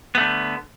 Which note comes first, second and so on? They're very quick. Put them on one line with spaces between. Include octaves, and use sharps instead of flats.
B3 A3 D3